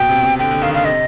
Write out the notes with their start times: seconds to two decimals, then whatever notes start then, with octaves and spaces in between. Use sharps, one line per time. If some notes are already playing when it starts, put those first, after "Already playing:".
Already playing: B2 G5
0.09 C3
0.23 C3
0.39 D3 G5
0.51 D3
0.62 D#3 F5
0.74 D3 F5
0.85 C3 D#5